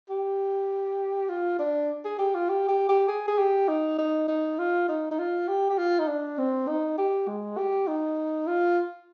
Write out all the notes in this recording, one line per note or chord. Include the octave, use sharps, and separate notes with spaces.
G4
F4
D4
G#4
G4
F4
G4
G4
G4
G#4
G#4
G4
D#4
D#4
D#4
F4
D#4
D#4
F4
G4
G4
F4
D#4
D4
C4
D#4
G4
G#3
G4
D#4
F4